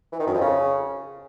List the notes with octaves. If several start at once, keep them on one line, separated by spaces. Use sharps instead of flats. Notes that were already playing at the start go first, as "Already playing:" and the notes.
E3
D#3
F#2
F2
C#3